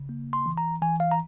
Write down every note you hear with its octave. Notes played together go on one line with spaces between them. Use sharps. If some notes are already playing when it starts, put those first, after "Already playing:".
Already playing: C#3
A#3
C6
E3
A#5
E3 G#5
F5
A#5